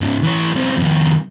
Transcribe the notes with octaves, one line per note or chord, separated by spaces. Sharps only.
G#2 C#3
E3 C#5
B1 C4
F2 D#3